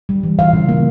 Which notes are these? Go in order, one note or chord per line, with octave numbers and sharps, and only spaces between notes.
G3
E3
E3 F5
C#3
A#3